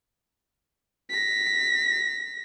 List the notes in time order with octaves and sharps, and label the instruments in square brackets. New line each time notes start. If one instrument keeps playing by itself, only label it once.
[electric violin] A#6 B6